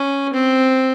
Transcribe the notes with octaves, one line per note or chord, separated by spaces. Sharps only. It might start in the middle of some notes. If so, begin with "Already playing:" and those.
Already playing: C#4
C4